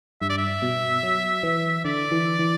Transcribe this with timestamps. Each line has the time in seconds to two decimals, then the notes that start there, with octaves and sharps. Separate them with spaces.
0.21 G2 E5
0.30 D5
0.38 E5
0.62 B2
1.03 F#3
1.43 E3
1.85 D3 D5
2.11 E3
2.39 E3